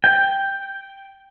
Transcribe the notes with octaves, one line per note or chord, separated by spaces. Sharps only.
G5